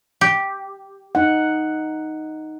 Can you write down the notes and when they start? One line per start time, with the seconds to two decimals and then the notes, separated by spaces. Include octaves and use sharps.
0.21 G4
1.15 D#4 F#5